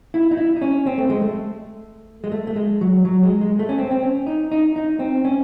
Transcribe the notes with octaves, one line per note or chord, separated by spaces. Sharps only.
E4
D#4
E4
D#4
C#4
C4
A3
G#3
A3
G#3
A3
A3
G#3
F#3
F#3
G#3
G#3
A3
C#4
C4
C4
C#4
D#4
D#4
D#4
C4
C#4